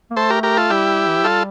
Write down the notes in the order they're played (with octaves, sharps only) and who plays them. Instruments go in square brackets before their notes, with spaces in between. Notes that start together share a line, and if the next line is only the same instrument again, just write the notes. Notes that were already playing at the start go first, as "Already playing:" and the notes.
[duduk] A#3
[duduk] A3 [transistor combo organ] A4 C5
[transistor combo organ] G4 A#4
G4 A#4
F4 A4
[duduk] G3 [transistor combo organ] E4 G4
[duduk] E3
F3
[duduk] G3 [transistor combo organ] F4 A4